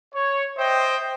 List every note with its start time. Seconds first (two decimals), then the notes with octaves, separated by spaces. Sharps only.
0.13 C#5
0.58 C5 D#5 E5 G5